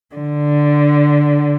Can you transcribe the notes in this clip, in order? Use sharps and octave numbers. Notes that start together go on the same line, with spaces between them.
D3